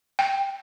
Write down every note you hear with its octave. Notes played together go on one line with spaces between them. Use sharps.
G5